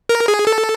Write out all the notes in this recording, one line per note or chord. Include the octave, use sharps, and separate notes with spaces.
A#4
G#4
A4